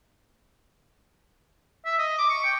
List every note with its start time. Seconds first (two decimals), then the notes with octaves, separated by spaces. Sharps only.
1.85 E5
1.99 D#5
2.18 D6
2.30 C#6
2.45 G5